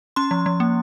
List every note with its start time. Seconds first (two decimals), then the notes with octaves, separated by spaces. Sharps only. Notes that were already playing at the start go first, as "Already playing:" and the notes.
0.16 C#4 C6
0.31 F3
0.46 F3
0.60 A#3